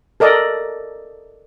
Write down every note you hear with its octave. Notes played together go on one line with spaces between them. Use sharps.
A4 A#4 D5 D#5